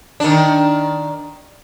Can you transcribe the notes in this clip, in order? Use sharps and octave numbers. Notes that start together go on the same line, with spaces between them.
D#3 D4